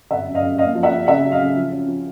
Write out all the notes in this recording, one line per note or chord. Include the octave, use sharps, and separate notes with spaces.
G1 E5 F#5
F#2
D#5 F5
F#2
A#3 D#5 F5
F3
E5 F#5
F3
C#3 E5 F#5
F#3
D#5 F5
C#3
F3
C#4
F3